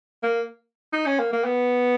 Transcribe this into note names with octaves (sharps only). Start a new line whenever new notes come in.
A#3
D#4
C#4
A#3
A#3
B3